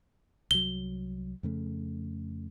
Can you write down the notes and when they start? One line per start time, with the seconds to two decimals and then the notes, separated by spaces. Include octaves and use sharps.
0.51 C2 F#3 G7
1.43 F2 C#3 A3